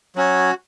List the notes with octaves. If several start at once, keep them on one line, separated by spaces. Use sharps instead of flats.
F#3 C#4 F#4 C#5